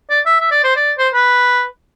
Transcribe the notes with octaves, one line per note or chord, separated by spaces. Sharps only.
D5
E5
E5
D5
C5
D5
C5
B4